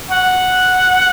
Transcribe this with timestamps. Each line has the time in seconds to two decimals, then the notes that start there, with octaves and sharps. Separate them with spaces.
0.11 F#5